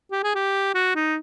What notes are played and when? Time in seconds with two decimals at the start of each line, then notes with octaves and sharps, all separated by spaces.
0.12 G4
0.24 G#4
0.35 G4
0.75 F#4
0.95 D#4